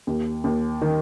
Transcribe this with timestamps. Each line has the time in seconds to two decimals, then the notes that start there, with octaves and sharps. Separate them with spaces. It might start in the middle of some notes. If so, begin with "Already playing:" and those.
0.07 D#2
0.44 D#2
0.82 D#3